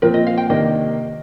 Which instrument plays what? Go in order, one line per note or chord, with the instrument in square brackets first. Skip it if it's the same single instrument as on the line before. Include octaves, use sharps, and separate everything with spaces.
[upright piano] A#2 F3 C4 [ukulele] A#4
[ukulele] D#5
F5
G5
[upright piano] C3 D#3 A#3 D4 [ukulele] D#5